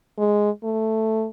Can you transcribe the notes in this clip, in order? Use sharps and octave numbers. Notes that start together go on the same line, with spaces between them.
G#3
A3